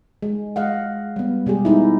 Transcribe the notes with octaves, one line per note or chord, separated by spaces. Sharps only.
G#3
G#3 D#5 F5 F#5
G3 B3
B2 G3 G#3 G4 G#4
G#3 B3 D#4 E4